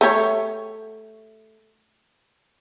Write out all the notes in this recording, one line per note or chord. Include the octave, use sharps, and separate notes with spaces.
A3 G4 C#5